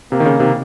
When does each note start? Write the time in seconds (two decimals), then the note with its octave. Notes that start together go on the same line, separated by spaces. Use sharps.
0.12 C3 A#3
0.20 D#3
0.25 C#3
0.39 C3 D#3